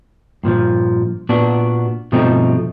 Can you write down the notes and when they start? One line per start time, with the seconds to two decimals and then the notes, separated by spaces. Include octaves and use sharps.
0.44 G2 A#2 D#3 F3
1.29 A#2 B3 D4 F#4
2.12 G2 B2 F3 A3 C4 D#4